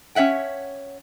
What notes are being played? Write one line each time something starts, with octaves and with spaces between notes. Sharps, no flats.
C#4 C#5 E5 F#5 G5